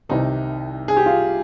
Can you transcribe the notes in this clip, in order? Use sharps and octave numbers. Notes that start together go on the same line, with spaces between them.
C2 C3 D#3 D#4
G#4
G4
F4